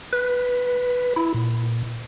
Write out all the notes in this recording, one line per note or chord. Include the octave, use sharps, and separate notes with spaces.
B4
E4
A#2